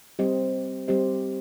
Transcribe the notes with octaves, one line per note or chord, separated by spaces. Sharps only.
G3 C4 G4 C5 D#5
G3 C4 G4 C5 D#5